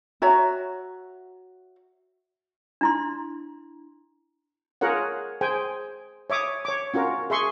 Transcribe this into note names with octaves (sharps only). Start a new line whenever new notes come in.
F#4 C#5 E5 A#5
D4 E4 C6
F4 G#4 A#4 C#5 F#5
G#4 C5 G5 G#5
C#5 E5 D6 D#6
C#5 D6
C#4 F4 F#4 A#4
G#4 E5 C6 C#6